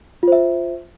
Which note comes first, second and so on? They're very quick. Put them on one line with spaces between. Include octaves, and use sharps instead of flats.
F4 C5 E5